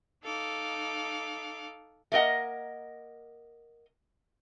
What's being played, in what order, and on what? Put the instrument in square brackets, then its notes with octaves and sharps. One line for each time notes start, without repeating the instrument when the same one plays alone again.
[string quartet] D#4 A4 F5 D6
[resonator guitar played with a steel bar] A3 A#3 A#4 D#5 F#5